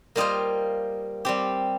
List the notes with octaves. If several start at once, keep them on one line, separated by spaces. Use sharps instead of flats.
G3 A#3 F4 C5 D#5
G3 C4 G4